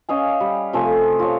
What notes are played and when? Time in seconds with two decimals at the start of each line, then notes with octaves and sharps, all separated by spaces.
0.09 C#4 D#5 F5 G#5
0.40 G3
0.73 C3 F3 A3 G#5
1.19 F4 C#5